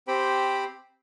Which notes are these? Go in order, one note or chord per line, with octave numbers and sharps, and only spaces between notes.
C4 G4 C5 G5 B5